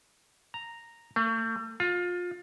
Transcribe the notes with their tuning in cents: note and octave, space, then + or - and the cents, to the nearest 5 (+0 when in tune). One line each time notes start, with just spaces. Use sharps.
A#5 -5
A3 +40
F4 +25